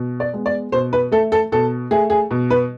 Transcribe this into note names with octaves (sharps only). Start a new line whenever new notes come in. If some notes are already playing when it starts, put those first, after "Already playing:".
Already playing: B2
D5
G#3 B3
D5
B2 C5
B4
A3 A4
A4
B2 A4
A3 G#4
G#4
B2
B4